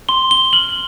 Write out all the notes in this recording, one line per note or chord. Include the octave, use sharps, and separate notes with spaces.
C6 G7
G7
F6 F#7